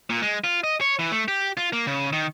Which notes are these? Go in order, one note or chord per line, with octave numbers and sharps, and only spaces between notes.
A#2
G#3
F4
D#5
C#5
E3
A3
G4
F4
A#3
C#3
D#3